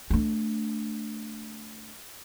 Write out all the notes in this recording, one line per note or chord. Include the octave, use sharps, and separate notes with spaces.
A3 D4